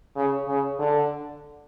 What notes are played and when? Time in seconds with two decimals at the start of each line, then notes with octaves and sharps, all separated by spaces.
0.16 C#3
0.48 C#3
0.79 D3